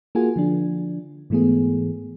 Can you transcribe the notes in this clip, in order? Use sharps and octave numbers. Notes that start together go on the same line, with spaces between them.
A#3 F4 F#4 G#4 G#5
D3 F3 D4
G#2 E3 A3 B3 G#4